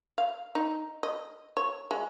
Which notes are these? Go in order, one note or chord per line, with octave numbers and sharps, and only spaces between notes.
F5
D#4
D#5
C#5
G#3